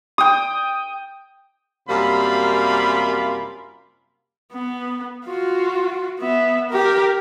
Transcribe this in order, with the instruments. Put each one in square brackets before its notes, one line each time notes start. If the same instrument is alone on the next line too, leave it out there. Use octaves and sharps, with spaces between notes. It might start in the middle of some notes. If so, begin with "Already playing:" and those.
[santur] G5 D#6
[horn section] F#2 C3 G3 A#3 F4 B5
[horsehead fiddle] B3
F4 F#4
B3 E5
G4 A#4